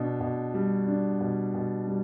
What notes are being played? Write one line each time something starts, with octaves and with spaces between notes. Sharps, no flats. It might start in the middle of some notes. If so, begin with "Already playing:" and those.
Already playing: B2 D4
B2
G3
D4
B2
B2
G3